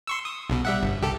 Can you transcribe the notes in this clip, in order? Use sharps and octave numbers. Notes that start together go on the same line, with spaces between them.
C6 C#6 E6
D#6
B1 B2
G3 E5 F#5
G1
C2 G4 A4